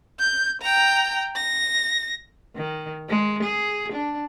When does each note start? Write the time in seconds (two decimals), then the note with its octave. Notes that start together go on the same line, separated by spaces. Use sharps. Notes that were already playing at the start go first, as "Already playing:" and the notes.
0.19 G6
0.62 G5 A#5
1.36 A#6
2.56 D#3
3.08 G#3
3.43 G#4
3.92 D4